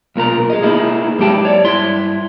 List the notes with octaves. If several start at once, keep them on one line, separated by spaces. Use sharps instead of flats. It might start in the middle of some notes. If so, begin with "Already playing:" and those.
B1 A#2 A#4 A#5
G#4 D#5
A#3 D#4 E4 G#4
G#2 F#3 G4 G5 A5
C#5 D5
G2 E4 C6